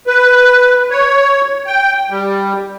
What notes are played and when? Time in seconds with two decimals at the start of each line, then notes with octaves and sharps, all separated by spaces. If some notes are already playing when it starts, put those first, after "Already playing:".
0.07 B4
0.90 C#5
1.67 G5
2.10 G3